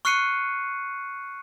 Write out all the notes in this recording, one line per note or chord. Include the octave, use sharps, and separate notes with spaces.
C#6 F6 F#6 C7 C#7 D#7